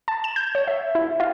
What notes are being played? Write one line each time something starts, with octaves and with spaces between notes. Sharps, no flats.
A5
E7
G6
C#5
E5
E4
F4